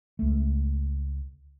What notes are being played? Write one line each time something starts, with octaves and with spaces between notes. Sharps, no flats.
C#2 A3